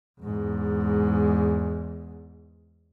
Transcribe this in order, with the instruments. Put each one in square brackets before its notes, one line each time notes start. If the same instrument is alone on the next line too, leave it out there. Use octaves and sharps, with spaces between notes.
[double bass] E2 G#2